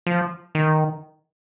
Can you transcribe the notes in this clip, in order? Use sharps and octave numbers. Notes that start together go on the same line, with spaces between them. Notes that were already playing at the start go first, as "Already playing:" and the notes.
F3
D#3